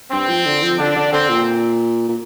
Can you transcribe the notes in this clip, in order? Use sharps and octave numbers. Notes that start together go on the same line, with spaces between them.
G2 C4
F3
D3
F3
D3 D4
D3
D3 C4
A#2
A#2